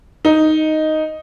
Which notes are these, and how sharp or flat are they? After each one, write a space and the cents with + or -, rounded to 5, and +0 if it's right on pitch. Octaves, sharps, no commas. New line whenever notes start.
D#4 +0